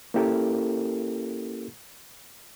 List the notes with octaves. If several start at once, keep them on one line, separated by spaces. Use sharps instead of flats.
A#3 C#4 E4 G4 A4 A#4